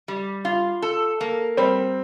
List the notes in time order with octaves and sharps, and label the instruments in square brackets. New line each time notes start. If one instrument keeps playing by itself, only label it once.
[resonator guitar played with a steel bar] G3
F4
A4
A#3
[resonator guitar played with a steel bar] G3 [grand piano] C4